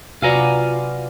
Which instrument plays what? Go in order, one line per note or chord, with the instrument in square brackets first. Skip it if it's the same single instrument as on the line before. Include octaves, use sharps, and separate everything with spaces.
[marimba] C3 [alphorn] F4 [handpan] F#4 B4 D5 [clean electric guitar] F5 G#5 A#5